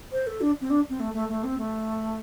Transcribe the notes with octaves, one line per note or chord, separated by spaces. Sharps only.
C5
A4
D4
C4
D4
C4
A3
A3
A3
C4
A3